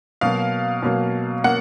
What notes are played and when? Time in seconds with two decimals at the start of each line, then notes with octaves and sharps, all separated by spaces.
0.21 B2 F#3 A#3 F5
0.83 B2 F#3 A#3
1.44 A#3 F#5